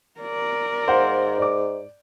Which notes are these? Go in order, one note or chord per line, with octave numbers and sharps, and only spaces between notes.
A#4 D5
G#2 C5 F5 F#5
D5 D6